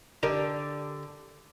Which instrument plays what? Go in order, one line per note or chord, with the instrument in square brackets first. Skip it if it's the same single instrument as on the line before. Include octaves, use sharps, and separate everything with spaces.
[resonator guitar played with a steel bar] D3 G4 D5 [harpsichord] D#4 A#4